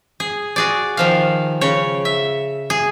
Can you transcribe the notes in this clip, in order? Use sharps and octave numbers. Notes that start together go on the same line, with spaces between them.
G#4
F#4 G#4 D5
D#3 F3 F5
C#3 C#5
E5
G#4